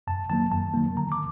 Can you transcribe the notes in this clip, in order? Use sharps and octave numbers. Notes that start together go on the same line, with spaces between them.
F#2 A5
D#3 F#3 A#3 A5
F#2 A5
D#3 F#3 A#3
D3 A#5
D6